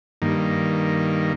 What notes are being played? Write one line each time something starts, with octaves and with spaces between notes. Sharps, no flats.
G2 D#3 A#3